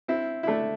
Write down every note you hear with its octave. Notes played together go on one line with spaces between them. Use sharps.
C4 E4
E4
A3 D4